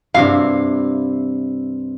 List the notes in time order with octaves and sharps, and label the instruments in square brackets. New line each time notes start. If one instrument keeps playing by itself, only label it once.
[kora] G2 C3 E4 [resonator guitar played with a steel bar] F5